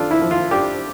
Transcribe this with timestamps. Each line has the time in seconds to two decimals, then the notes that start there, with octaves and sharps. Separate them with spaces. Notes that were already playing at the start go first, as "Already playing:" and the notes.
Already playing: D4 F4 A4
0.11 E4
0.21 F3
0.31 F4
0.51 D4 G4